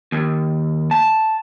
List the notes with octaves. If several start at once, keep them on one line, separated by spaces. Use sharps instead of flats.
D#2
A5